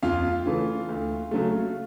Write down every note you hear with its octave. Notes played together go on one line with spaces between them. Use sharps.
F2 F4 F5
C#3 E3 A3
D2
C#3 F#3 A3